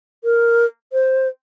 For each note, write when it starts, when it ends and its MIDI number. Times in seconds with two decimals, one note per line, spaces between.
0.24 0.65 70
0.93 1.28 72